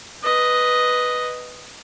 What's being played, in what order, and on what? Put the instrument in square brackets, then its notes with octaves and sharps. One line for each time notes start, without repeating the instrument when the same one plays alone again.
[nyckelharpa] B4 D#5